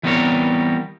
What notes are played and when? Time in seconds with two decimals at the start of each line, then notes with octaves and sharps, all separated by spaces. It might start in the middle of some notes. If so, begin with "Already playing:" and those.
0.03 E3 G3 B3 C4 A#4 C#5